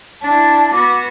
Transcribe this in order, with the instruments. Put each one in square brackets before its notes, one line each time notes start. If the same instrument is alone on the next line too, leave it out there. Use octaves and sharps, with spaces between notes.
[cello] D4 E4 [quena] A5
[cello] B3 F#4 [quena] D6